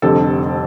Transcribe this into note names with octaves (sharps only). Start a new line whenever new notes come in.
F1 F2 D3 G3 A4